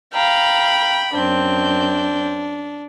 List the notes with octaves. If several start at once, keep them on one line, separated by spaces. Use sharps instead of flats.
F5 G5 A#5 B5
F#2 C4 D4 G6